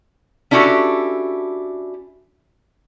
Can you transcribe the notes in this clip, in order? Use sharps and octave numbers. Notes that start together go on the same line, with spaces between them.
C#4 D4 E4 F#4 G4 A4